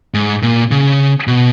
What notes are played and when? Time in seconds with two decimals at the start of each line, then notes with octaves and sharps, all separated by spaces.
0.14 G#2
0.43 A#2
0.71 C#3
1.27 B2